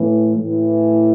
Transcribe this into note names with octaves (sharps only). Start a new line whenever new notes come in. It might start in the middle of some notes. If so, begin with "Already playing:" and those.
Already playing: A2 E3
A2 E3